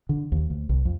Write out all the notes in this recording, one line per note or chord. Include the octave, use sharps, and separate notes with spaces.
D3
D#2
D2
C2
F2